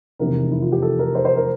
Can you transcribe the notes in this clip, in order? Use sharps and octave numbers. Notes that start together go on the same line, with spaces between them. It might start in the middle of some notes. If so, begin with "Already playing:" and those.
F1 E2 C3 A#4
E4
F4
G4
A4
A#4
C5
C5
A#4